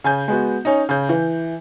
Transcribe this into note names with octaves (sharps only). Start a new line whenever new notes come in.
C#3 G#5 G6
G#3 B3 F#4
C#4 D#4
C#3 G6
E3